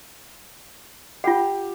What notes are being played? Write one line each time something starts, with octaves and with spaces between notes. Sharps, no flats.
F4 G4 F#5